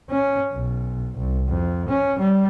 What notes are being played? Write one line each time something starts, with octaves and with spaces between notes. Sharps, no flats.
C#4
B1
C2
F2
C#4
G3